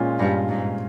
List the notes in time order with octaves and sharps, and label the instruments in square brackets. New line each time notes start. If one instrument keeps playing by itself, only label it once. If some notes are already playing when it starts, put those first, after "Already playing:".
Already playing: [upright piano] A#2 G#3 C#4 F4
[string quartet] G2
G#2